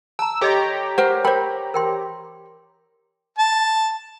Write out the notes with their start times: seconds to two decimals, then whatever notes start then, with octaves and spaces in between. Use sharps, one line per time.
0.19 A5 A#5 E6
0.41 G4 A4 C#5 D#5 A#5 C6
0.98 A#4 C5 F#5
1.25 A#4 C5 G5 B5
1.74 A#4 G5 C6
3.39 A5